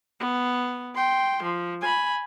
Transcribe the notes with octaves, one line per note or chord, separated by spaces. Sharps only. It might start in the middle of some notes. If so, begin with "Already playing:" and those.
B3
G5 C6
F3
G#5 B5